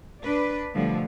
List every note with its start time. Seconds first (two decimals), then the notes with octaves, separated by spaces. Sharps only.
0.22 D4 B4 D5
0.74 D2 B2 D3 F3 G3